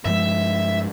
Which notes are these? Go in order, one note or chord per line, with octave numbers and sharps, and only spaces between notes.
G2 F3 G#3 E5